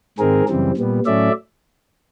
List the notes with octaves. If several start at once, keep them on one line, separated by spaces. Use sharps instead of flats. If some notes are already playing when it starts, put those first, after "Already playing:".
G#2 D#3 G#3 C4 G#4 A#4
F#2 C#3 E3 G3 C4
A#2 G3 B3
A2 F#3 A3 C#4 D5 E5